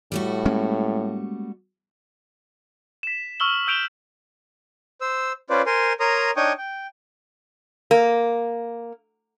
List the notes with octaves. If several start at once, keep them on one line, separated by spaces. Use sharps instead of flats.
A2 G3 A3 F#4
G#3 A#3 C#4
B6 E7
C#6 E6 F6 F#7 G7
E6 G6 D7 E7 F7 G7
C5 E6
C#4 F4 B4 C5 D5
A#4 C5 G#5 C6
A#4 C#5 A#5 C6 D#6
D4 D#4 C#5 G5 C#6 D#6
G5
A#3